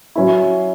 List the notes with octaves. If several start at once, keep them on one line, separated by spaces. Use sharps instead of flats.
F#3 C#4 E4